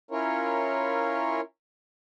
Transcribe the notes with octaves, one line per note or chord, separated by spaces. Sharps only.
C#4 E4 F4 A#4 C#5